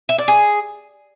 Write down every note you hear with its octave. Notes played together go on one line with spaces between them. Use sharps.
E5
D5
G#4